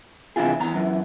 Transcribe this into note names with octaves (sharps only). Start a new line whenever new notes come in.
C3 E3 D4 E4 F4 G#4
E2 E3 A#5
F#2 E3